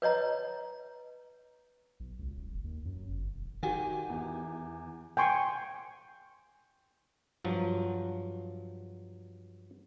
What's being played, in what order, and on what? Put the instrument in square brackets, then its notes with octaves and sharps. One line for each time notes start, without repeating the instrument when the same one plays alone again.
[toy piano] B4 C#5 D#5 A#5
[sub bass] B1
C#2
D1
F#1
D#2
F#2
G1
E1
[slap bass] D#3 [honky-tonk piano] F#4 G4 G#5
[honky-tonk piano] E2
[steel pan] G5 G#5 C6 C#6
[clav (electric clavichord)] G2 F3 F#3